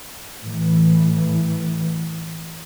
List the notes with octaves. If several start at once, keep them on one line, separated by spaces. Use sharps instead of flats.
A2 E3